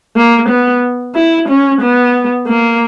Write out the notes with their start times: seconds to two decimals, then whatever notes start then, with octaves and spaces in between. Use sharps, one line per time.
0.16 A#3
0.49 B3
1.15 E4
1.49 C#4
1.81 B3
2.47 A#3